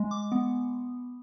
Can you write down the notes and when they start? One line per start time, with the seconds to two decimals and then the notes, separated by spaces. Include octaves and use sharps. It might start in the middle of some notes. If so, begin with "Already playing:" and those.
Already playing: G#3
0.11 D6
0.32 B3